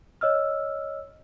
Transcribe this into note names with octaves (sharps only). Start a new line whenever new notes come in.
C#5 D#5 E6 F6